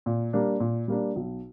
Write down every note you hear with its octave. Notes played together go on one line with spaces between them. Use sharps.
A#2
G3 A#3 D4
A#2
G3 A#3 D4
B1